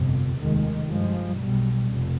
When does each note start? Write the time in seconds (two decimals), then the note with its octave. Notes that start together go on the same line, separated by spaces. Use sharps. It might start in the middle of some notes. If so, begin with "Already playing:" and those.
Already playing: G1 F2 C3
0.39 F1 D#2 D#3 G#3
0.88 G2 F3 G#3
1.39 B1 B2 G3
1.88 F1